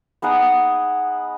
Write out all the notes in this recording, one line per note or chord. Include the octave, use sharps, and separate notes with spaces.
B3 D#4 G#4 F#5